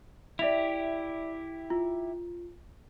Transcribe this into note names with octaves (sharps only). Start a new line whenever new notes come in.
E4 G4 D5 E5 F7
F4